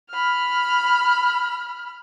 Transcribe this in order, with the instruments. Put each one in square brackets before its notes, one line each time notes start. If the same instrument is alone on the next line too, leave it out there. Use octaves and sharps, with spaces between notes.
[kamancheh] B5 F6